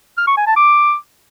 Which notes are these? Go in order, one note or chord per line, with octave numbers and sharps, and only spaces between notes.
F6
C#6
G#5
A5
D6